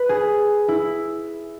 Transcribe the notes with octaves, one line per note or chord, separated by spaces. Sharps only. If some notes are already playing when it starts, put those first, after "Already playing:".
Already playing: B4
G#4
E4